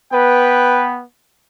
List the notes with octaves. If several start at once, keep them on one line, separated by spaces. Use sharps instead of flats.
B3 B4 G5